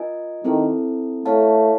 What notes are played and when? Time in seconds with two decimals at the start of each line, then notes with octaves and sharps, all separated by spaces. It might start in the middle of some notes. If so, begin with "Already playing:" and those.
Already playing: F4 A#4 D#5 G#5
0.44 D#3 C4 E4 A4
1.26 A3 E4 A4 C#5 F5 A5